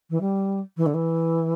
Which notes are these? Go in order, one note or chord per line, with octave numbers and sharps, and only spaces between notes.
E3
G3
E3
D3
E3